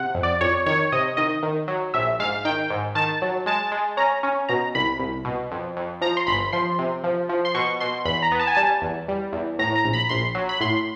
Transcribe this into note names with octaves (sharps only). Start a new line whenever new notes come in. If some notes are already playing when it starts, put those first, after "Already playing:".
Already playing: C3 F#5
F2
D5
F2 C#5
D#3 C#5
C3 D#5
D#3 D#5
D#3
F#3
A#1 E5
G#2 F5
D#3 G5
G#2
D#3 A5
F#3
G#3 A5
G#3
C#4 A#5
C#4
B2 A#5
C2 B5
C2
B2
F2
F2
F3 A#5
C6
G1 B5
F3 C6
C3
F3
F3
C6
B2 C#6
B2 C6
E2 B5
A#5
B3
A5
G#5
G3 A5
E2
G3
E2
A2 A#5
A#5
A#1
B5
A#1 C6
F#3
B5
A2 C6